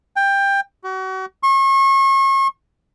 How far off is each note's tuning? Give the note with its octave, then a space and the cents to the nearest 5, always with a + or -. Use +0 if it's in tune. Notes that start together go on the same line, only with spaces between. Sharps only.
G5 +15
F#4 +35
C#6 -35